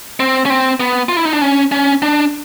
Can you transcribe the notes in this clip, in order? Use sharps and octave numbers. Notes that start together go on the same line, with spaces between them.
C4
C#4
C4
B3
F4
E4
D#4
D4
C#4
C#4
D4